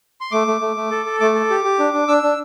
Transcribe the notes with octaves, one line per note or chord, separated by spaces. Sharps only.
C6
A3 D6
A3
A3
A3
A4
A4
A3 D6
A4
G4
G4
D4
D4
D4 E6
D4